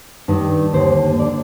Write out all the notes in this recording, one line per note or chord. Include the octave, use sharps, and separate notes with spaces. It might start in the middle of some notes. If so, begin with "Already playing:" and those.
G2 D#3
D#2 D3 C5
D3 D5